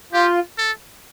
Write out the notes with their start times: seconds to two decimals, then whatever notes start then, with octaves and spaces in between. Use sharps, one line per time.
0.13 F4 G4
0.58 A4